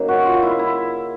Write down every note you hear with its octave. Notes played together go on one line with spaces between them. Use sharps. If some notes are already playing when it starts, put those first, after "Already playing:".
Already playing: C#3 F#3 A#3 D#4
F#4
F4
E4
E4